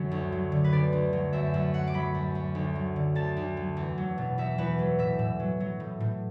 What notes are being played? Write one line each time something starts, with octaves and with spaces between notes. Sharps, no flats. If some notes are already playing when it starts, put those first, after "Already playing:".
Already playing: F#2 D3 F#3
D2
F#3
D3
B4
D2 D5
D2
F#3
F#2 E5
F#2
F#3 F#5
D6
F#3 B5
F#2
F#2
D2
F#3
D3
D2 A5
D2
F#3
E2
F#3
B2
E2 E5
E2 B4
F#3
A2 E5
A2
F#3
F#3
A2
A2